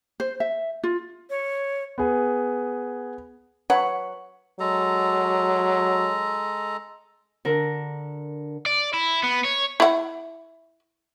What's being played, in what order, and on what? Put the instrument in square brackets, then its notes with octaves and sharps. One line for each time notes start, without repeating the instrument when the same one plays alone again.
[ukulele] C5
E5
F4
[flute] C#5
[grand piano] B3 G#4
[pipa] F#3 B4 C#5 F#5
[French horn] F#3 [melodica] G#3 A4 A#5
[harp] D3 A#4
[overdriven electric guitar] D5
E4
B3
C#5
[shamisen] E4 F#5